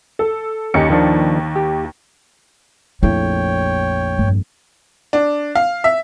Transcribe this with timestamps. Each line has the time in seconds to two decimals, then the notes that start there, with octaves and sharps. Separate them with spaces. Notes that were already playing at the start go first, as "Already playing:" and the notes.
0.19 A4
0.74 D#2 C#4 D#4 G4 C#7
0.90 D#3 F3 D4
1.56 G4
3.03 A#1 F2 A3 E4 C#5 G5
4.18 G2
5.13 D4
5.55 F5
5.84 E5